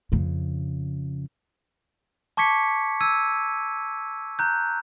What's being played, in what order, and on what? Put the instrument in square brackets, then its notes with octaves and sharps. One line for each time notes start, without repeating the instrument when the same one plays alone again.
[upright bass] F2 C#3
[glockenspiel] A5 C#6 D6 G#6 B6 C#7
E6 G#6 D#7
A#5 F#6 G6